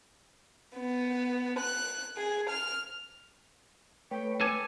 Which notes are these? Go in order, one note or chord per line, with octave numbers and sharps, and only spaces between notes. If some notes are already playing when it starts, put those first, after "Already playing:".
B3
F#6
G#4
F6
A3 B4 C#5 G5
A4 G#5 D6